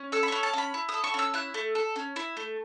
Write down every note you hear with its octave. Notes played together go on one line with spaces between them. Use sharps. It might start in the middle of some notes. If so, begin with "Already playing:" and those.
Already playing: C#4
A4 E6
B5
C#4 C#6
A5
C#4 B5
E4
D#6
A4
C#6
C#4 E6
E4 F#6
A3
A4
C#4
E4
A3